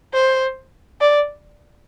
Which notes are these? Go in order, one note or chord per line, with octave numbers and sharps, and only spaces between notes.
C5
D5